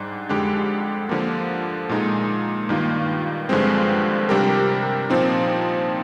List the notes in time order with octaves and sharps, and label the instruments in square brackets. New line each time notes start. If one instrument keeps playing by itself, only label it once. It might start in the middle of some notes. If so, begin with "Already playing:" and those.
Already playing: [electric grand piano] G#2 G3 D4
F2 D3 G#3 D4 G4
D3 F3 A#3
A#2 G#3 D#4
G2 D#3 A#3 F4
G2 D3 F3 G#3 C4
C3 G3 D4 G4 A#4
A#2 F3 C4 D#4